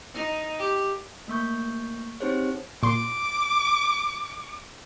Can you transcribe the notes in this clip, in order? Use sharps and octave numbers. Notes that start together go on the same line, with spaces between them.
D#4
G4
A3 A#3 C#6 G6
C4 D#4 G4 G#4 C5 C#5
A#2 C6 D6